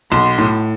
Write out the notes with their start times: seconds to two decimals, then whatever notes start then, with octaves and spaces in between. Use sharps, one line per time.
0.12 B1 C6
0.38 A2